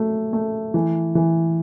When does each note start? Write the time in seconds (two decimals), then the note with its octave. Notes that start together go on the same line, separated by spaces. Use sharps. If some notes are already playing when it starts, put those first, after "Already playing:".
Already playing: F#3 A3
0.33 A3
0.74 E3
1.15 E3